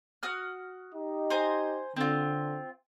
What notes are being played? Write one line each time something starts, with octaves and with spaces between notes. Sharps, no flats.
F#4 D#6 F6
D#4 G4 D#5
C5 G#5 A#5
D3 C4 F4